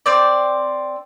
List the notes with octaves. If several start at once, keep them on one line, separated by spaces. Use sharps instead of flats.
C4 D5